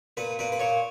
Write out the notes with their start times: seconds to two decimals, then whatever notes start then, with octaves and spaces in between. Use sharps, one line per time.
0.17 A#2 B4
0.39 A#2 B4
0.52 B4
0.59 A#2 C#5